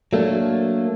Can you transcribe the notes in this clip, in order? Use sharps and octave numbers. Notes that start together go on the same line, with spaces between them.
F#3 A3 A#3 D4